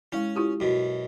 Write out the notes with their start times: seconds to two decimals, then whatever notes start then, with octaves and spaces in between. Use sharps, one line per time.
0.12 G#3 C#4 E4
0.36 E4 F4 G4
0.60 F#2 B2